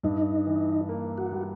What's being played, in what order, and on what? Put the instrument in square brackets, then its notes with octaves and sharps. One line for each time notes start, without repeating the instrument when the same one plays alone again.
[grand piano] G2 [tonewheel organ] D#4
[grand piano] E3
A#3
[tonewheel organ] F#4
[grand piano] G3